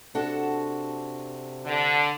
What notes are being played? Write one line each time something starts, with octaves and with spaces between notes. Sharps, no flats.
C3 D4 F#4 A4
D3